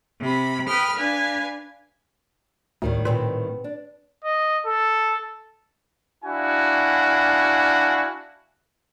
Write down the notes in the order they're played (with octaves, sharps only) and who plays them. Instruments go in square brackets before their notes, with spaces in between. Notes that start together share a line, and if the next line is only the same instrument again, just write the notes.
[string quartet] C3 B5
B4 G5 B5 D#6 F6
D4 B4 F5 G#5
[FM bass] D2 [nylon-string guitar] A2 D#3 G3
[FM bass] A#2 [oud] B3 C4 B4
[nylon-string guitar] D4
[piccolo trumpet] D#5
A4
[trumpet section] D4 E4 F#4 F5 G#5